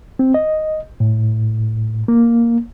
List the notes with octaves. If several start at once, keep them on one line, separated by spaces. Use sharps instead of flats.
C4
D#5
A2
A#3